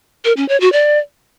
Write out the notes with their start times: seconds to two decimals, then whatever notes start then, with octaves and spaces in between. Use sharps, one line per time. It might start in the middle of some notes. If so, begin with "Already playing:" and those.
0.25 A#4
0.37 C#4
0.49 C#5
0.61 F#4
0.72 D5